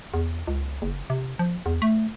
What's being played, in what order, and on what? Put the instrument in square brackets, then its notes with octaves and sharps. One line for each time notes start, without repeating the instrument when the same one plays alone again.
[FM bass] E2
C#2
F#1
C3
F3
E2
A3